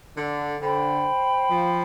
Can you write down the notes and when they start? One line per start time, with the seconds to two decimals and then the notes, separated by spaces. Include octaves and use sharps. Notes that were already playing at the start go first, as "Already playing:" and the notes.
0.15 D3
0.60 D3 C5 G5 B5
1.50 F3